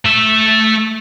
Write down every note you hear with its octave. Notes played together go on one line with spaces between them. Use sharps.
A3 E5